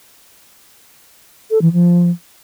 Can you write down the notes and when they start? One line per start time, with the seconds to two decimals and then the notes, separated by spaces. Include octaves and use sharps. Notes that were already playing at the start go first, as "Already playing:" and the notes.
1.51 A4
1.62 E3
1.73 F3